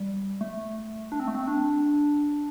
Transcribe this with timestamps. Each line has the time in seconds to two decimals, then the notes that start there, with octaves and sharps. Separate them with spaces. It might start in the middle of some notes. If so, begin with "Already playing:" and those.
Already playing: G3
0.41 A3
1.12 D4
1.20 C4
1.28 A3
1.35 C4
1.47 D4